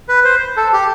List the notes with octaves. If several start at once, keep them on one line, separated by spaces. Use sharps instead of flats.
B4
C5
A4
G4